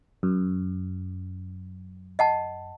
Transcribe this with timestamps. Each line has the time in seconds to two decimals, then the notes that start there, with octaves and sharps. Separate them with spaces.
0.23 F#2
2.19 D#5 F#5 A5